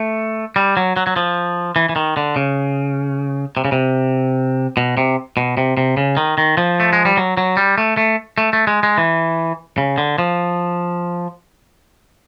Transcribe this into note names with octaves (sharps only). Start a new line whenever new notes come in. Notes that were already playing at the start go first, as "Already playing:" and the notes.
Already playing: A3
G3
F#3
F#3
F#3
F3
E3
E3
D#3
D3
C#3
C3
C#3
C3
B2
C3
B2
C3
C3
C#3
D#3
D#3
F3
A3
G#3
G3
F#3
F#3
G3
A3
A3
A3
A3
G#3
G#3
E3
C#3
D3
F3